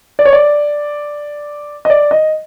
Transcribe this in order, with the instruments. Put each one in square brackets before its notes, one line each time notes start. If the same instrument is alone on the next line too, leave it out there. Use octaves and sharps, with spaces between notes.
[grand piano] D5
C#5
D5
D#5
D5
D#5